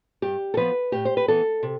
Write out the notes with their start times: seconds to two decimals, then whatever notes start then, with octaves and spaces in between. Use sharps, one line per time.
0.22 G2 G4
0.54 A4
0.57 F3 B3 B4
0.92 A2 G4
1.05 C5
1.17 B4
1.28 E3 B3 A4
1.63 C3